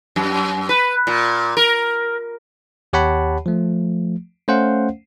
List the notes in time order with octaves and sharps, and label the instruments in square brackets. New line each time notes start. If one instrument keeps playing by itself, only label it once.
[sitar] F#2
B4
A#2
A#4
[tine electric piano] D#2 G4 C#5 F#5 A5 B5
F3 A3
A3 C#4 C5 F5 F#5